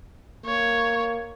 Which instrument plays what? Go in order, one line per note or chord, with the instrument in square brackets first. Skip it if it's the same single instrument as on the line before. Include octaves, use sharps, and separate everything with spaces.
[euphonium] A#3 [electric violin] C#5